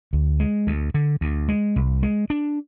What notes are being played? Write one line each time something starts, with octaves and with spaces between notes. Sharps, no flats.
D2
G#3
D2
D3
D2
G#3
C2
G#3
D4